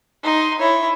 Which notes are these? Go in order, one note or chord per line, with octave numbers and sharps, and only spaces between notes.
D#4 C6
E4 C#5